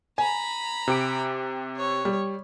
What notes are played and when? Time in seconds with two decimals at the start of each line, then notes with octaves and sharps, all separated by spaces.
0.18 G#5 A#5 B5
0.88 C3 G4 D7
1.76 C#5
2.05 G3